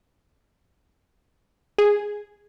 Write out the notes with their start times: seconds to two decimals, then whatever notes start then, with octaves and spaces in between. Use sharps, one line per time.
1.78 G#4